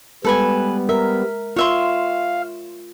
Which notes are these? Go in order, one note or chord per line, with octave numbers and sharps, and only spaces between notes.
G3 G#3 B3 A4 B4 G#5
A#4 E5
F4 C#5 E5 F5 C6